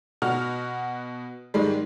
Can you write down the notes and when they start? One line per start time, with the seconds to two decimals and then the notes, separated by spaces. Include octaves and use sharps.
0.22 B2 F#4 F6
1.54 G#2 D#3 G3 G#3